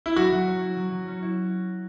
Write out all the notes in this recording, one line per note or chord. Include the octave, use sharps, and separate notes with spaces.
E4
F#3 F#4
F#3
C#4
E4
F#3
F#3
C#4
E4